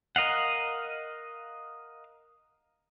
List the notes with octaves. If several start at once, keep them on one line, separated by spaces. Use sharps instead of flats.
A#4 D#5 F5 F#5